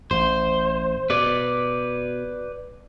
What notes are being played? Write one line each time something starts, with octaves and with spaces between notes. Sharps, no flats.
A1 C5
B2 B4 D5